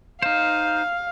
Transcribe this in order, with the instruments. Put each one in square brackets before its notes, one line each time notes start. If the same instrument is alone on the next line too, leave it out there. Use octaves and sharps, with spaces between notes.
[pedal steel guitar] D#4 C5 [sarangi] F5